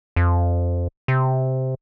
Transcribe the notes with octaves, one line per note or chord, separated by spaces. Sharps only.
F2
C3